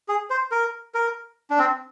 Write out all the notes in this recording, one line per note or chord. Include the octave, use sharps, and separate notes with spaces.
G#4
C5
A#4
A#4
D4
C4